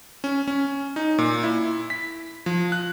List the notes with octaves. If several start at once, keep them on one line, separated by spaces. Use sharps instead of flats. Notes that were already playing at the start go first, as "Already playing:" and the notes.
C#4
C#4
D#4
A#2
E4
B6
F3
F#6